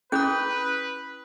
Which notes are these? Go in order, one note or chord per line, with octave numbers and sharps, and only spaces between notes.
C#4 E4 G#4 B4 D#6 F#6 G6